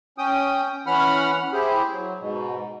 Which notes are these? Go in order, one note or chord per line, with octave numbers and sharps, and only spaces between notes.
C#4 G5 D#6
E3 C#4 F#5 B5 F6
E4 G4 G#4 C5
F#3
G#2 B2